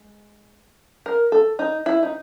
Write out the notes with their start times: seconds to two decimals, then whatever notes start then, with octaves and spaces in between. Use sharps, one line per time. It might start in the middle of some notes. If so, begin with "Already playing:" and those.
Already playing: G#3
1.06 A#4
1.32 A4
1.59 D#4
1.86 E4
2.03 D#4